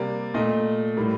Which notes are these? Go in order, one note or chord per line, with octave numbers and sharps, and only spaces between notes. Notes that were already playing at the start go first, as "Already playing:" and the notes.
Already playing: C3 G3 A#3 D5
A#2 A3 D#5
A2 G3 A#3